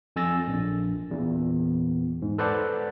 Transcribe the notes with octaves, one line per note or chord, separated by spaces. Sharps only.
F2 G#5 E6 A6 A#6
A#1
E2 A#2
G#2
A4 B4 C5 D5 F#5 A5